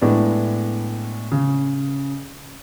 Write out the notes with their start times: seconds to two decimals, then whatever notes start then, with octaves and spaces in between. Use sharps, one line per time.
0.01 A2 G#3 B3 D4
1.31 C#3